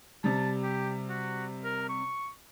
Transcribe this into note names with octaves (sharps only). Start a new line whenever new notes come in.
C3 G3 A5
G4
F#4
A#4
C#6